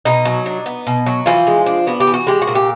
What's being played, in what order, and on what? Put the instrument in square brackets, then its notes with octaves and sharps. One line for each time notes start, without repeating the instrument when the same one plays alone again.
[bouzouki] B2 D#4
F#3
D4
B3
B2
F#3
E3 F3 F4
G#3
D4
B3 F#4
G4
E3
F#4
G#3 G4
F#4
A#2
G4